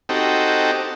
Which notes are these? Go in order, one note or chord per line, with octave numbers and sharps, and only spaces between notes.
C4 D#4 F#4 G4 A4